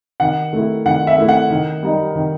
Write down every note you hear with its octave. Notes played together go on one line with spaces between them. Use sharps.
D#3 F#5
A3 E4
D#3 F#5
E5
A3 E4
F#5
D#3
G3 D#4
D#3